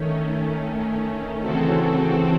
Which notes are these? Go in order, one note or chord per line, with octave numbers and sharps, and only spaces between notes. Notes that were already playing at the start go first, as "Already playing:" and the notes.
Already playing: D#3 A3 C#4
C#3 E3 C4 F#4 A4